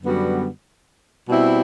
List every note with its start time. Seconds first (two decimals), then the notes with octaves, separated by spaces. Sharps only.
0.02 F#2 D3 G3 B3 F#4
1.28 B2 G3 C4 E4